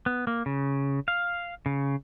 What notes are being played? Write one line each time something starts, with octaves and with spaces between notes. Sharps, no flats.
B3
A#3
C#3
F5
C#3